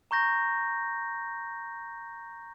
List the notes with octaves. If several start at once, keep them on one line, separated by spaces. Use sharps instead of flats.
A#5 C#6 G6 A#6